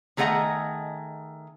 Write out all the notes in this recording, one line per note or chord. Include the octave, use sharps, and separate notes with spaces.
D#3 A3 G#4 D#5 F#5 A#5